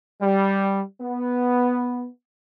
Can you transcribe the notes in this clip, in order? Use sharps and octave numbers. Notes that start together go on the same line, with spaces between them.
G3
B3